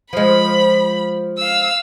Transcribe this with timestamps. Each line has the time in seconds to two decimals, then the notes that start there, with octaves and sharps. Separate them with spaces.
0.13 F3 G#3 B5
1.38 F5 E6